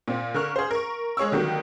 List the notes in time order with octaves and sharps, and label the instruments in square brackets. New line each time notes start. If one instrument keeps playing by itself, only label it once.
[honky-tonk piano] A#2 C4
D3 A#4 C#6 F6
G#4 C5
A#4 C#6
G#3 G#4 C#5 C#6 E6
D3 D#3 F#3 G3 A#3